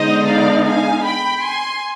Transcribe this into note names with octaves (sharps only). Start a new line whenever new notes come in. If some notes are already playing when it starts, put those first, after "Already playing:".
Already playing: D3 G#3 B3 D#4 C5 D#5
D5 F5
F5 G#5
G5 B5
G#5 C6